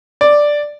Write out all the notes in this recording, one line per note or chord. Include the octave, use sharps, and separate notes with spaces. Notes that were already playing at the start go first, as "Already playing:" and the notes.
D5